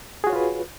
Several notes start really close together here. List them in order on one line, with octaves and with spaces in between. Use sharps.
G#4 F#4 C#5 F4 B4